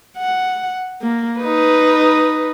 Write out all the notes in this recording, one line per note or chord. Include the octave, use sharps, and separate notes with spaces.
F#5
A#3
D#4 B4